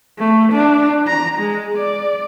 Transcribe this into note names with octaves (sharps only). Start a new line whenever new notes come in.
A3
D4
A#5
G#3
D5